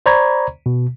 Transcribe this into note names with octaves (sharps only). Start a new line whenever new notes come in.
C5 D5 A#5 B5 C#6 G#6
B2